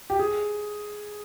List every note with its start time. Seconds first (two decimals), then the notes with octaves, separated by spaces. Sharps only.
0.10 G4
0.19 G#4